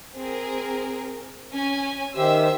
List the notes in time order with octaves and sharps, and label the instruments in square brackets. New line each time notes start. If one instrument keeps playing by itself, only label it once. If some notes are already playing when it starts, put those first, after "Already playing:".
[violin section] C4 G#4 A#4
C#4 G#5
[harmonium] D#3 G4 [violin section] C5 E5 E6